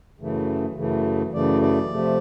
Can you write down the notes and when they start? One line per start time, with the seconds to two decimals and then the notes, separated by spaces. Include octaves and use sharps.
0.20 F#2 C#3 E3 A3
0.77 F#2 C#3 E3 A3
1.33 F#2 C#3 E3 A3 D5
1.62 D5
1.91 C3 F3 A3